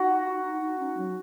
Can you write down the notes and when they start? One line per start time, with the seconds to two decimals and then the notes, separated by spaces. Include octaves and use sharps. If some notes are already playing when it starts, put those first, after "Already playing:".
Already playing: D#4 F#4
0.44 D#4
0.62 D#4
0.79 C#4
0.97 F#3